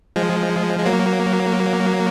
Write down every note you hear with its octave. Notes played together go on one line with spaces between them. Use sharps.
F3 G#3
G#3
F#3 A#3